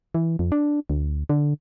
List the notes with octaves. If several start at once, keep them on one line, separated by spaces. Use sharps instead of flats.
E3
F2
D4
D2
D3